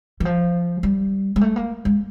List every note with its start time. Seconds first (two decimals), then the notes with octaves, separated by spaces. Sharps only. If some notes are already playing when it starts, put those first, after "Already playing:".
0.20 E3
0.25 F3
0.83 G3
1.36 G#3
1.41 A3
1.56 A#3
1.85 G#3